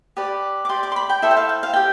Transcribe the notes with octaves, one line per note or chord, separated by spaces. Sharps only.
G4 B4 D5
D6
G4 D5 C6
D6
C6
B5
G5
E4 A4 C5 E5
G5
F5
G5
F5
G4 G5